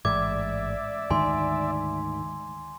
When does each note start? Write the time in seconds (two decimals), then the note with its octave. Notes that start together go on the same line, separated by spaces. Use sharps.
0.05 A1 G#2 D5 E5 D6 G#6
1.10 D2 G#2 D#3 G#5 C6